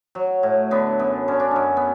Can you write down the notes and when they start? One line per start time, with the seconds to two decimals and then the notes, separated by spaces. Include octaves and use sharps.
0.15 F#3
0.43 A2
0.71 D3 B3
0.99 F#2 B3
1.28 D3 C#4
1.40 D4
1.51 F#2 C#4
1.77 B3